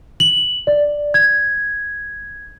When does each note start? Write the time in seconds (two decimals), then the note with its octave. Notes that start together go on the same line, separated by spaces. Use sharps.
0.20 F#7
0.67 D5
1.14 G#6